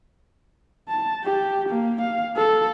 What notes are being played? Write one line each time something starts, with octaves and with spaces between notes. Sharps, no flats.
A5
G4
A#3
F5
A4